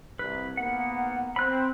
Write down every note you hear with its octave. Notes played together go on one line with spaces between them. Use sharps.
C2 B4
G#2 A#3 B3 F#5
C4 B5 F#6